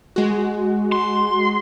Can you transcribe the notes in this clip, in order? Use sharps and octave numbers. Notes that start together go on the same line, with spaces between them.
G#3 F#4
C6